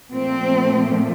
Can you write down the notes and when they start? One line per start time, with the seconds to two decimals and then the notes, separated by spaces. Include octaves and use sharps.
0.11 A#2 F3 A3 C4